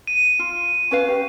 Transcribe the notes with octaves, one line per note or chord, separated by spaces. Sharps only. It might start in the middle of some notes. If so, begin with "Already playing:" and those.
D#7
F4
C#4 B4 F5
G4